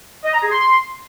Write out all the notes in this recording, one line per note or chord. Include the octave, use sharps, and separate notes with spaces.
D#5
A#5
G#4
C6